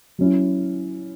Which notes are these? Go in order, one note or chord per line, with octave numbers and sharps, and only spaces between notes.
F#3 C#4 E4